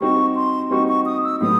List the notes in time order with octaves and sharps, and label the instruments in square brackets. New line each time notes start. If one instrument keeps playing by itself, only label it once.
[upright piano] G3 C4 D#4 F#4 [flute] C#6
[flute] C6
[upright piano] G3 C4 D#4 F#4 [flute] C#6
[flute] C#6
D#6
E6
[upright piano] A2 F#3 B3 [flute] D#6